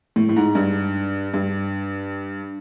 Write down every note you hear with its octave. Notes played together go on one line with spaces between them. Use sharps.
A2
A2
G#2
G2
G2